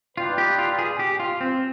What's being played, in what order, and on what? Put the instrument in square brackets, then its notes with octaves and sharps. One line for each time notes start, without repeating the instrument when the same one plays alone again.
[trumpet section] D#4 B4 D5 G5 [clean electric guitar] F4
[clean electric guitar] G4
F4
G#4
G4
F4
C4